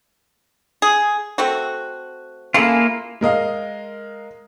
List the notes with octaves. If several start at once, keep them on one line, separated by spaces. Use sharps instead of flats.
G#4
A3 C4 F#4
A#3 C#4 E4 F4 G#4 A4
G#3 A#4 D#5 F5